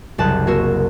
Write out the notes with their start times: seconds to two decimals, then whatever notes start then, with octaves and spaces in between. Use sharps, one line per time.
0.18 F#1 C2 A5 F#6
0.47 A#3 F#4 A#4 E6